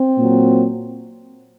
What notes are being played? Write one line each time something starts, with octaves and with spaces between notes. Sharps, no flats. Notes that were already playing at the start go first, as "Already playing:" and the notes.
Already playing: C4
A#2 F#3